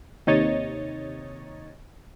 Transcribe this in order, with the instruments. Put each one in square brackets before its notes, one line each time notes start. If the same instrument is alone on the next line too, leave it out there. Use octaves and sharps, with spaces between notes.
[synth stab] D#2 C3 D#4 C#5 D#5 A6